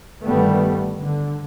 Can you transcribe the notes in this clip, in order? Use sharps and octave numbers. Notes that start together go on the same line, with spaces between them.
G1 D#3 G3 A3 B3
D3